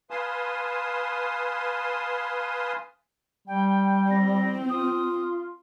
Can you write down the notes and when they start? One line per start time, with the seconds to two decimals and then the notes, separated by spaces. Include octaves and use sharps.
0.11 B4 F5 G#5 A5 C6 D#6
3.47 G3 G5
4.11 C4 A#6
4.70 F4 D#6